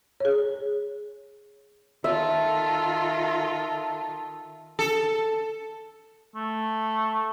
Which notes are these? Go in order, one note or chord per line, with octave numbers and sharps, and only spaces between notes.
G#4 C#5
D#3 F4 A4 E5
A4
A3